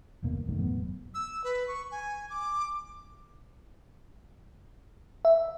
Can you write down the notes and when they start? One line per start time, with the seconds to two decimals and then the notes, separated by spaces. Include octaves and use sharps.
0.23 F#1 D#2 B2 A#3
0.47 C2 F#2 D#3 A3
0.59 E1 A2 F#3 B3
1.14 E6
1.44 B4
1.68 C#6
1.92 G#5
2.30 D6
5.25 E5